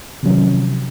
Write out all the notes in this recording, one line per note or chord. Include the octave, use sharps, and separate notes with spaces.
C3 D#3 F3 F#3 C#4